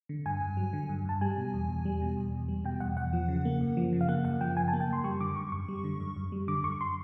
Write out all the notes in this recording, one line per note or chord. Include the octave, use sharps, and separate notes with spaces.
D3
G2 G#5
G2
F#3
D3
G2
G2 A5
G3 G#5
B2
E2
E2
G3
B2
E2
E2
G3
B2 G5
E2 F#5
E2 F#5
F3
C#3
A#3
F#2
F3
C#3
F5
A#3 F#5
F#2 F#5
F3 G5
C#3 G#5
A5
A#3
G5
F#2 C6
G3 C#6
D3 D6
F#2 C#6
F#2 C#6
G3
D3
F#2
F#2
G3
D3 D6
F#2 C#6
C6